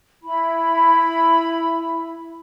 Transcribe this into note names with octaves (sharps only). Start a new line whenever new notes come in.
E4 B5